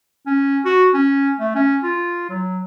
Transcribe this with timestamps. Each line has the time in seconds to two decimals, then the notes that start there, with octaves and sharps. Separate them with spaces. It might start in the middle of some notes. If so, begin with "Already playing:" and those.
0.26 C#4
0.65 F#4
0.94 C#4
1.39 A3
1.55 C#4
1.83 F4
2.29 F#3